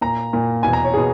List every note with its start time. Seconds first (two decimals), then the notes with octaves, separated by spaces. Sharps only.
0.01 A#2 A#5
0.33 A#2
0.63 E2 B2 G#5
0.73 A#5
0.84 C#5
0.94 B2 G#4